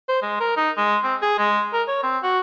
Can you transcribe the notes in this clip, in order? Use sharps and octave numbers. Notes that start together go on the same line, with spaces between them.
C5
G#3
A#4
D#4
G#3
C4
G#4
G#3
A#4
C#5
C4
F#4